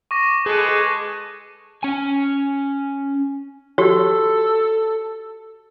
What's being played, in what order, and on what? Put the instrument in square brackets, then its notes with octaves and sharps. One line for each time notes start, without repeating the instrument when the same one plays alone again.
[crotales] C#6 D6 A#6
[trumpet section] G#3 A4 B4 [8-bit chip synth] G#4
[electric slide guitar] C#4 G#5
[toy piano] F#4 G4 C#5 [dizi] A4